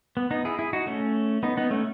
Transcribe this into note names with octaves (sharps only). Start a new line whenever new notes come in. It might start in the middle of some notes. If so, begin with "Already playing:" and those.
B3
B3 D#4
E4 G#4
E4 G#4
D#4 F#4
A3 C#4
B3 D#4
B3 D#4
A3 C#4